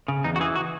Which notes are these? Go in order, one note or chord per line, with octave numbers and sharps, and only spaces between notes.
C#3
E2 D#4
F#4
E3 G#4
F#4